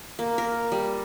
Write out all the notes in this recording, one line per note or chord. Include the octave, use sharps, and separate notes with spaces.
A#3
A#4
G3